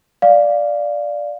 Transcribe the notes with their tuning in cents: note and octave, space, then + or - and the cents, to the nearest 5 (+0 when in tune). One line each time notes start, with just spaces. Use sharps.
D5 +0 F5 +0